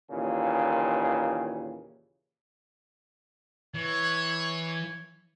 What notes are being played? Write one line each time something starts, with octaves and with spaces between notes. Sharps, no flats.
D#2 A#2 C#3 E3
E3 C#5